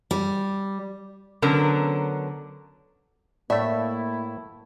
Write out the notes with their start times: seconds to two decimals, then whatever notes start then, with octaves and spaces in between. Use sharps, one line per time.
0.11 G3
1.42 D3 F#3 B3 C#4 A#4
3.50 A2 A3 A#3 E4 D5 E5